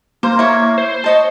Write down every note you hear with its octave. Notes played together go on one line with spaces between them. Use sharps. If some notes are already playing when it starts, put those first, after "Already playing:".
A#3 C5
E4 C#5
C5
C#5 D#5 A5